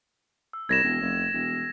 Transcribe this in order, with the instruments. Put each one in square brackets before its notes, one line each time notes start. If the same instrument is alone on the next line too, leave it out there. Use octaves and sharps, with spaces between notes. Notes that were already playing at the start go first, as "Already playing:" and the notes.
[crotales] E6
[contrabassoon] C2 [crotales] G#6 A#6 E7
[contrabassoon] E1
F1
E1